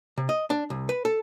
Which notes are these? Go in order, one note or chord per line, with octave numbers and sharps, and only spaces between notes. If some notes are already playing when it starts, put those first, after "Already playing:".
C3
D#5
D4
C2
B4
A4